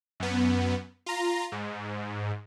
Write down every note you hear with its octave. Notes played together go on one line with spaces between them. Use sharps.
F#2 B3
F4 A#5
G#2